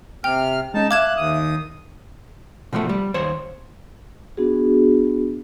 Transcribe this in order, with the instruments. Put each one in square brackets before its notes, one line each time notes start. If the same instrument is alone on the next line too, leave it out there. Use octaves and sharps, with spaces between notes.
[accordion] C3 F6 [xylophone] G5
[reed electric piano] G#3 C#4 [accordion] D#4 A5
[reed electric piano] E5 F5 [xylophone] D6 G#6 E7 [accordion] F#6
[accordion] D#2 D#6
[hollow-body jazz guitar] B2 F3 F#3 A3
G3
D#2 C5 C#5
[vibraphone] B3 D4 F#4 G#4